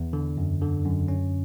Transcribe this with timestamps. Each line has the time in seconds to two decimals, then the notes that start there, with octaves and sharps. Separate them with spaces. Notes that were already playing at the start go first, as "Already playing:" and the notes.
Already playing: E2
0.13 D3
0.37 F#2
0.61 D3
0.85 F#2
1.08 C#4